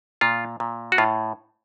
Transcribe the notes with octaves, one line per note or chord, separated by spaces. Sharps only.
A#2 F4
A#2
F#4
A2 F4